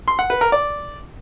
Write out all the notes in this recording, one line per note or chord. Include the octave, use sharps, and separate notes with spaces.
C6
F#5
B4
A#4
D5